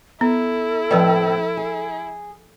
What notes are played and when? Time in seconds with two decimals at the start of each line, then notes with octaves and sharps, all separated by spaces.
0.21 B3 E4 A4
0.91 D#2 A2 F3 C4 B4 D5
1.57 G#4